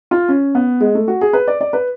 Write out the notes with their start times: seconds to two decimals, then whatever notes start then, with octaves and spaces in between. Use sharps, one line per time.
0.11 F4
0.28 C#4
0.55 B3
0.80 G#3
0.95 A3
1.08 F#4
1.21 G#4
1.33 B4
1.47 D5
1.61 D5
1.73 B4